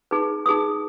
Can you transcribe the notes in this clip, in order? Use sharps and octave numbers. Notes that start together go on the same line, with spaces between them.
D#4 G#4 B4
D#4 G#4 B4 D#6